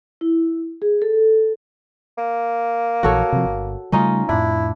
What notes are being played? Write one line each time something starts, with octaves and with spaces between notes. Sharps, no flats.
E4
G#4
A4
A#3
A#1 E3 F#4 A4 C#5
C3 F3
G1
C#3 G3 A3 C#4 D#4 F4
F2 A2 D4 E4